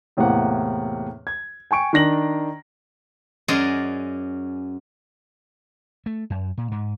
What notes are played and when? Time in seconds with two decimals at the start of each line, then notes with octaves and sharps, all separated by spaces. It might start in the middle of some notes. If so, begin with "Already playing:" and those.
0.17 E2 A2 C3 A#3 F#5
1.27 G#6
1.71 G5 G#5 C#6 D7
1.93 D#3 D4 A#6 F#7
3.48 F#2 C#4 G#4 D5 D#5 C6
6.06 A3
6.30 F#2
6.58 A#2
6.71 G#2